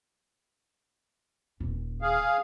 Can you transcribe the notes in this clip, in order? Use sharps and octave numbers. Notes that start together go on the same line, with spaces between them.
D#1 C#4
G#4 F5